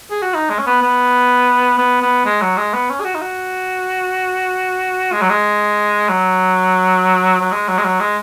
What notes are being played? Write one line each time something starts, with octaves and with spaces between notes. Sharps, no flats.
G#4
F#4
D#4
G#3
C#4
B3
B3
B3
B3
G#3
F#3
G#3
B3
C#4
G#4
F#4
D#4
F#4
G#3
F#3
G#3
F#3
F#3
G#3
F#3
G#3
F#3
G#3